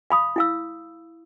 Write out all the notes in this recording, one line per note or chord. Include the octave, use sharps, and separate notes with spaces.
F5 B5 D#6
E4 F5 E6